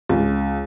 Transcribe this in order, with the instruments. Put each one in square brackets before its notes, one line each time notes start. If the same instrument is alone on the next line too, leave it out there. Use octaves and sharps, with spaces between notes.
[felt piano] C#2